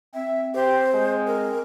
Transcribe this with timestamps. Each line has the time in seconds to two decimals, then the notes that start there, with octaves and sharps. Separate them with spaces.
0.14 C4 E5
0.55 G4 C5
0.94 G#3
1.27 A#4